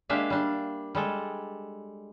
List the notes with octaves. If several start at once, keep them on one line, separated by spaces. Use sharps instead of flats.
G#3 A#3 D4 G4 E5 F5
G3 D4
G3 G#3 A4